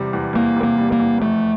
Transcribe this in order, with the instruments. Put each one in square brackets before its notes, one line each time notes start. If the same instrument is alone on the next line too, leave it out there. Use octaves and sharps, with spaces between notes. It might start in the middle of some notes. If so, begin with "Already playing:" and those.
Already playing: [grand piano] E2 C3 G3
E2
[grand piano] E2 [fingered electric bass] A#3
[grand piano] C3
[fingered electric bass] A#3
[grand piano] G3
[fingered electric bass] A#3
[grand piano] E2
[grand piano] F2 [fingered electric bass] A3